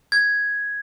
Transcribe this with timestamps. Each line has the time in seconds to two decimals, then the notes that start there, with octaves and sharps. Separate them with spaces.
0.12 G#6